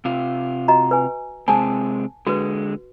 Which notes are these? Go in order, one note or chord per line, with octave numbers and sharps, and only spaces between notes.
C3 F4
F#4 D#5 A#5
B4 G#5
C3 G#3 C4 G#5 A5
D3 G#3 F#4 B4